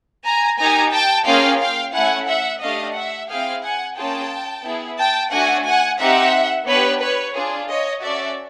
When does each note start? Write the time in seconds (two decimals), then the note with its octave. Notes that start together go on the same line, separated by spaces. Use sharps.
0.25 G#5 A#5
0.58 A#3 D#4 G4 G#5 A#5
0.93 G5 A5
1.27 A#3 C#4 F4 G#4 F5 G5
1.60 F5 G5
1.94 A3 C#4 E4 F#5 G#5
2.28 E5 F#5
2.61 A3 D4 G4 D#5 F5
2.95 E5 F#5
3.29 C4 E4 G#4 F5 G5
3.63 F#5 G#5
3.96 A#3 C#4 F4 G#4 G5 A5
4.64 B3 E4 G#4
4.98 G5 A5
5.32 A3 D4 F#4 F#5 G#5
5.66 F#5 G#5
5.99 C4 D#4 G4 E5 F#5
6.67 B3 D4 G4 B4 C#5
7.01 B4 C#5
7.35 D4 F4 G#4
7.68 C#5 D#5
8.02 C#4 F#4 A4 D5 E5